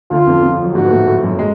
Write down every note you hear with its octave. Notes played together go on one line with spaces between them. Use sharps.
D2 D3 F4
F2 F3
F2 F3
F#3
G#2 G#3 F#4
B3
A2 A3
A2 A3
F#2 F#3
G#3